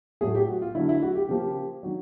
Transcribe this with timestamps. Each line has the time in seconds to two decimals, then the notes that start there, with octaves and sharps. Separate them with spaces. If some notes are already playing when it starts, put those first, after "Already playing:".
0.21 A2 F#3 A3 G#4
0.35 G4
0.48 F#4
0.62 F4
0.74 D3 F#3 A3 E4
0.89 E4
1.02 F#4
1.15 G4
1.29 C#3 F3 A#3 G4
1.83 D#3 F#3